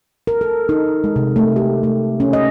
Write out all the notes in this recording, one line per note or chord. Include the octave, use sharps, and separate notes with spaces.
A#4
A4
D#4
G#3
C3
A3
G4
A3
C#4
D#5